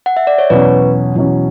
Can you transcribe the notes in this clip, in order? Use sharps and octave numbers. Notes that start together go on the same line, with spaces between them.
F#5
E5
D5
C#5
E2 B2 F#3 C#4 B4
E2 B2 F#3 C#4